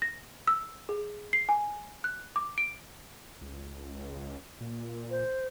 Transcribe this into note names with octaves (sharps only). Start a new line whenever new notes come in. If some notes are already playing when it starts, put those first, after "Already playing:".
A#6
E6
G#4
C7
G#5
F#6
D6
D7
C#2
A#2
C5